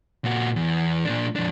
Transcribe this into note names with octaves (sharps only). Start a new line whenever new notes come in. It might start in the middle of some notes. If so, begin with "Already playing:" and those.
A#2 F#4
E2
A#2 D4
F2 D4